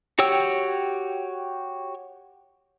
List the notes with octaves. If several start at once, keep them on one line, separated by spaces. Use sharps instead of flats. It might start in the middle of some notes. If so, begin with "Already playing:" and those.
F#4 G4 C#5 G5 E6